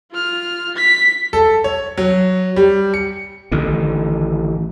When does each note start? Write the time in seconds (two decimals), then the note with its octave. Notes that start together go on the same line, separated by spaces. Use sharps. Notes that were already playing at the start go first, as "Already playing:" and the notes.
0.12 F4 F6
0.76 B6
1.33 A4
1.64 C#5
1.97 F#3
2.56 G3
2.94 C#7
3.52 A1 D3 D#3